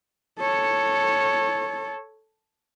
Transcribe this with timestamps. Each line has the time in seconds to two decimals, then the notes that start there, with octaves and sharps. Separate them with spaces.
0.40 A4 C#5